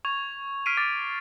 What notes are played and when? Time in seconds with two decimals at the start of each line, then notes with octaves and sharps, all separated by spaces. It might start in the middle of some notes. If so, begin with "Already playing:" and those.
0.05 C#6 G#6 F7
0.66 F6 B6 C7 D7 D#7
0.77 D6 A6 D#7